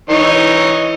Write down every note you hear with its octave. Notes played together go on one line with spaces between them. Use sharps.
E3 D#4 C#5